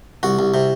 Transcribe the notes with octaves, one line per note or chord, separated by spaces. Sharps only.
C2 F#4
C2
C3